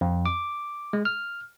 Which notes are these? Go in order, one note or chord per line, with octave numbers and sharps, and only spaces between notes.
F2
D6
G#3
F6